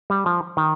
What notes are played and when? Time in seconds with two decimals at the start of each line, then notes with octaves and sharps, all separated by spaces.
0.10 G3
0.26 F3
0.57 D#3